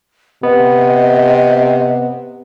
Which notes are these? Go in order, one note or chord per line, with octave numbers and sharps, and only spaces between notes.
C3 B3 D#5